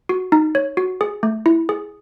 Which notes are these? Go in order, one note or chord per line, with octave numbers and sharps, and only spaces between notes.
F#4
D#4
C#5
F#4
G#4
A3
E4
G#4